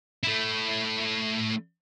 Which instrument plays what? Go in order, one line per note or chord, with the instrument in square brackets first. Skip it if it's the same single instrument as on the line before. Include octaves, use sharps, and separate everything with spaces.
[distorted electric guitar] A3 E4